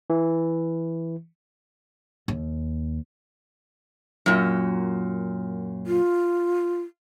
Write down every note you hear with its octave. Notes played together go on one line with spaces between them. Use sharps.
E3
D#2
F#2 A#2
F4